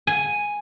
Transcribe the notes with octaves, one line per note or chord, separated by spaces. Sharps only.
G#5